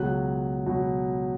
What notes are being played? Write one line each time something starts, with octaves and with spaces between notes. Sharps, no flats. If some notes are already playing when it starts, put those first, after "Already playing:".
Already playing: C#2 B2 F#3 F#6
B2 F#3